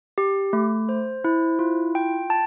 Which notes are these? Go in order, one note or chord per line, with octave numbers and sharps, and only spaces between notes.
G4
A3
C5
E4
F4
G5
A5